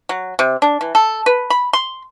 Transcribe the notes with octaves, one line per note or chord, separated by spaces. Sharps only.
F#3
C3
D4
E3
A4
B4
B5
C6